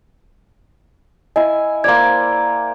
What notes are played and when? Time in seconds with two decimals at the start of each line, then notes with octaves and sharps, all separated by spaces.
1.36 E4 D#5 G#5
1.84 A#3 C5 D5 G#6